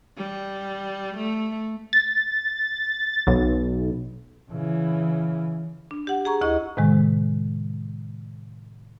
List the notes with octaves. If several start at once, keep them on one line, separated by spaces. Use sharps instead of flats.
G3
A3
A6
B1
C#3 E3
D4
G4 F#5
G#4 A#5 C#6
D2 E4 D#5 C#6
A2 C3 D#3 G#3